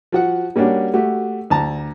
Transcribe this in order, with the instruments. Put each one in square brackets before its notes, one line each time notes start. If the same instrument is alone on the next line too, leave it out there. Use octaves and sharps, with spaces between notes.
[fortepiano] F3 F#4 F#5
G3 A#3 C#4 D4 F#4
A3 F#4 G4
D2 A5 A#5